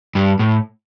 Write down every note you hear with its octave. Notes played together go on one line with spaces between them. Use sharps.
G2
A2